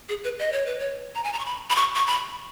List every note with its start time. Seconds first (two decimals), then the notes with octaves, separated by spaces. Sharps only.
0.09 G#4
0.24 B4
0.39 D#5
0.52 C#5
0.66 B4
0.79 C#5
1.15 A#5
1.24 G#5
1.33 A#5
1.39 C#6
1.46 B5
1.70 B5
1.76 C#6
1.95 C#6
2.07 B5